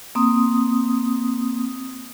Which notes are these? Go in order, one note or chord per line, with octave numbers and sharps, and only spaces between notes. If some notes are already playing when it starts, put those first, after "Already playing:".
A#3 C4 D#6